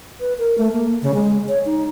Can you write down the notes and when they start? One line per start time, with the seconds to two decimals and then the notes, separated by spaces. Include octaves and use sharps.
0.20 B4
0.38 A#4
0.58 A3
0.72 A#3
1.02 C#3
1.14 G#3
1.48 C#5
1.65 D#4